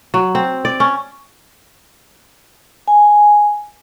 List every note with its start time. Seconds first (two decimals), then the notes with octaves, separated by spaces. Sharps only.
0.14 F#3
0.35 C4
0.65 D5
0.80 C#4
2.88 G#5